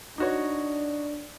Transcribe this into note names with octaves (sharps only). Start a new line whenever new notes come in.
D4 D#4 F#4 C#5